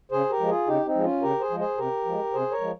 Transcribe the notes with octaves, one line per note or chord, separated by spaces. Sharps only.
C#3 G#4 C5
G4 A#4
F3 G#3
F4 G#4
C#3 D#4 G4
C4 D#4
F3 G#3
C#4 F4
C#3 G4 A#4
G#4 C5
F3 G#3
G#4 C5
C3 G4 A#4
F3 G#3
C3 G#4 C5
A#4 C#5
F3 G#3